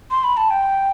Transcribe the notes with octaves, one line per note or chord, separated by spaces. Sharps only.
C6
B5
A5
G5